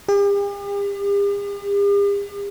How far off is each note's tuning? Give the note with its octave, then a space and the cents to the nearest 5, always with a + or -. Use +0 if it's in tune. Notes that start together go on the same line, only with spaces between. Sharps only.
G4 +45